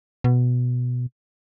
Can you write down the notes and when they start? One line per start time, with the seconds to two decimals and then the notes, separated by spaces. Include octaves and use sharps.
0.24 B2